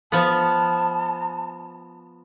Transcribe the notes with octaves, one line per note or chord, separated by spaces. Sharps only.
F3 B3 A5